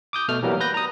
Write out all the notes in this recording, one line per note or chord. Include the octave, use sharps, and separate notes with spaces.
D6 D#6 G6
B2 A3 F6
E3 F#3 G3 A#3 B3
B4 G6 A#6
A#5 D#6